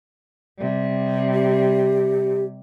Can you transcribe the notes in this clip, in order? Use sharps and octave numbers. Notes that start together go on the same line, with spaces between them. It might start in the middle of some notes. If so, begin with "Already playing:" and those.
C3 G3
G4